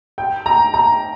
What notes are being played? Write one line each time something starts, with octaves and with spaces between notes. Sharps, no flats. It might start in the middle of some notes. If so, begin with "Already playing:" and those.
G5
A#5
A#5